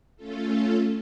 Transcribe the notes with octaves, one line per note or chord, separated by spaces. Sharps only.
A3 C#4 F4 A4